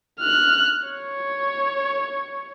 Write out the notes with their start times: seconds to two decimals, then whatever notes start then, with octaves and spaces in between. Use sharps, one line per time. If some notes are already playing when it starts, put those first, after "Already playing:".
0.20 F6 F#6
0.88 C#5